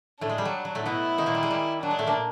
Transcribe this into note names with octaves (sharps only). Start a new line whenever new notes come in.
A2 A3 D4
G#3
G3
F#3
F#3
A2 A3
B2 B3 E4
D#3 D#4
A#2 A#3
G3
G#3
G3
F#3 D4
G#3
A2 A3
A#2 A#3